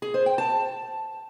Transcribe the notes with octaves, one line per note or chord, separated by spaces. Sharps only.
G#4
C5
G5
A5